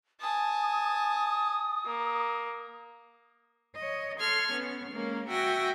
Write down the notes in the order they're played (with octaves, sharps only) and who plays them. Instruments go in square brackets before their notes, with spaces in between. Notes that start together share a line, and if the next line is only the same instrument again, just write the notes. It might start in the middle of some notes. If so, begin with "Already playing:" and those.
[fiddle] G#5 A5 [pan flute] D#6
[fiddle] A#3
[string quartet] C#5 D#5
A4 C6 F6 G#6
B3 C#4
G#3 A#3 C#4
F#4 E5 G5 G#5 A#6